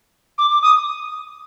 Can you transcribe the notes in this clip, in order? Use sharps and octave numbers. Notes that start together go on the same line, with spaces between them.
D6
D6
D#6